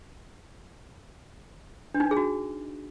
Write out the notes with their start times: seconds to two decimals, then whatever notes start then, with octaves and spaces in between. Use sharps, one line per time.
1.94 D4
2.00 D#4
2.06 D4
2.11 G#4
2.17 F#4